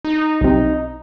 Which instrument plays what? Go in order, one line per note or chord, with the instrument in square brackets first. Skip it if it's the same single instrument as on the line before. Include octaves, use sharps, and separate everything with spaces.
[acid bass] D#4
[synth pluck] B1 C3